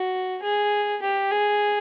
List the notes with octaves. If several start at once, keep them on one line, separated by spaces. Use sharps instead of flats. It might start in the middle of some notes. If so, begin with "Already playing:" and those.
Already playing: F#4
G#4
G4
G#4